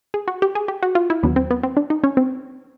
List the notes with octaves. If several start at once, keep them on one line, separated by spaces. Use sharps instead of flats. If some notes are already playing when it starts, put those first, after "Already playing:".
G#4
F#4
G4
G#4
G4
F#4
F4
E4
D#2 D3 F#3 B3
C4
B3
C4
D4
D#4
C#4
C4